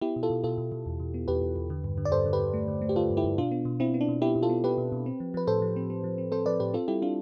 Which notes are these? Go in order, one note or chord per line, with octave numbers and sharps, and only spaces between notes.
B3 E4 G4
B2
F4 A4
B2
B2 F4 A4
B2
B2
E2
B2
B3
E2 G4 B4
E2
E2
D3
G2
D3
D5
G2 A4 C5
D3
G4 B4
G2
A3
D3
A3
G4
D3 F4 A4
G2
E4 G4
G2
B2 D4 F4
B3
B2
B2 C4 E4
B3
D4
B2
B3 E4 G4
B2
F4 A4
B3
B3 G4 B4
B2
B2
C4
F3
F3 B4
A2 A4 C5
F3
C4
C4
F3
C4
C4 A4 C5
F3 B4 D5
A2 G4 B4
C4 F4 A4
G3 E4 G4
C4 D4 F4